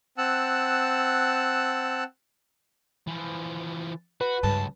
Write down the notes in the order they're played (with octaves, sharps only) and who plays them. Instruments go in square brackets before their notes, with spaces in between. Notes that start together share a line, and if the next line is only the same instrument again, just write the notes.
[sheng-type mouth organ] C4 F#5 A5 E6 F#6
[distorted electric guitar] E3 F3
[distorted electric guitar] F#4 [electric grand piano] B4
[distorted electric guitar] C#2 [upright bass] G2 [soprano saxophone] A5